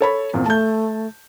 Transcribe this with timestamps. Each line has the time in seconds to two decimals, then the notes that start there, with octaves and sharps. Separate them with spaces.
0.01 A4 C#5 B5
0.34 E2 A#2 C4
0.46 A3 A5 G6